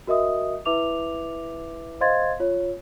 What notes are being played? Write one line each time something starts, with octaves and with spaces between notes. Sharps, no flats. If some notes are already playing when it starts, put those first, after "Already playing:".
F#4 A#4 D#5 E5 D#6
E4 B4 E5 D6 F7
C5 D#5 F5 C6 G#6 A6
F4 C#5